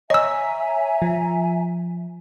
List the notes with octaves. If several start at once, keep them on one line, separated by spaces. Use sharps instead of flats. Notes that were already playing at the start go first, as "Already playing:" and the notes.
C#5 D#5 E5 G#5 A#5 E6
F3